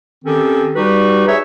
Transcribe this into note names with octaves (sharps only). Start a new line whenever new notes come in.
D#3 C4 C#4 G4 A4
G3 D#4 F#4 G4 B4
G#4 C#5 E5